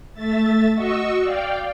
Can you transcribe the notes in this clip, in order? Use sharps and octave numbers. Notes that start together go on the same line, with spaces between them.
A3 E5 A6
F#4 D#5 C#6 E6
D5 F5 G5